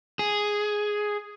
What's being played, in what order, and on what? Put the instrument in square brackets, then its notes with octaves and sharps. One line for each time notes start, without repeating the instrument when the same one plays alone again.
[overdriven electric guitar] G#4